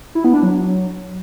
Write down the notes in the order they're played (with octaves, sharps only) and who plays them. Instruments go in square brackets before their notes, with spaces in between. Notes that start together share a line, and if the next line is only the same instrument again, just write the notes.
[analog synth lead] E4
B3
D4
F#3